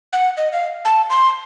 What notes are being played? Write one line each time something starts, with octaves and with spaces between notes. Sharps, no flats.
F#5
D#5
F5
A5
C6